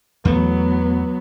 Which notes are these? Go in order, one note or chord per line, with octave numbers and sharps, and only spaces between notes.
E2 F#3 A3 B3